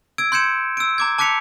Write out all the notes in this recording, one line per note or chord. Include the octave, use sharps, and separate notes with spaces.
E6 G#6 D7
C6 G6 G#6 C#7 E7
E6 D7
A#5 D6 G#6
A5 D6 F#6 B6 C#7 F7